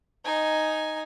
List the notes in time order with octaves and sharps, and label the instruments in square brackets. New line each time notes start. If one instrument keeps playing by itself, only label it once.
[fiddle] D#4 G#5